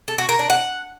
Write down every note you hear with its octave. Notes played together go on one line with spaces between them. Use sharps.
A4
F#4
A#4
D4
F#5